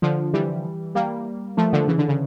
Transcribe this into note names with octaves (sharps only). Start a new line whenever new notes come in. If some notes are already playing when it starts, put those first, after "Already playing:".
D3 F3
E3 G3
G3 A#3
F3 A3
D3 F3
C#3 E3
D3
C#3